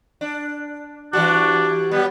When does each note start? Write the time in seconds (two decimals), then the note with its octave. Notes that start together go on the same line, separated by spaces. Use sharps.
0.21 D4
1.13 E3 G3 D4 F#4
1.91 F#3 G3 B3